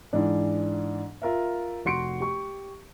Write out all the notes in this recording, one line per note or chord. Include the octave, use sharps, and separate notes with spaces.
G#2 E3 D4
F4 A#4 E5
F1 F#4 C6 C#7 D7
G4 C#6